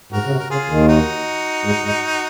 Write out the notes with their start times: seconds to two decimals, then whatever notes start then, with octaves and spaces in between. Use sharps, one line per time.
0.12 G#2 F#4 A#4
0.26 C#3
0.31 C3
0.39 A#4
0.51 C#3 F4 G#4
0.70 D#2 D#3
0.88 D#4 F#4
1.65 G#2 G#3
1.85 G#2 G#3